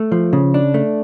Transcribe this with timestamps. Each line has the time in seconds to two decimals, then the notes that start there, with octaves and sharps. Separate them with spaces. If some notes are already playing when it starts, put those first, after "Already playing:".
Already playing: A3
0.12 F3
0.33 C#3
0.54 D4
0.74 A3